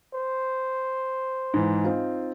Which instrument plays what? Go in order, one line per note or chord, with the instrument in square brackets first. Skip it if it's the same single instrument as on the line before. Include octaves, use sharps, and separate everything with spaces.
[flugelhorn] C5
[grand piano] G#2 E3
C4 D#4 F4